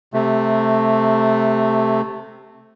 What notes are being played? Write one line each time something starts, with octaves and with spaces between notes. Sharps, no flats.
C3 A3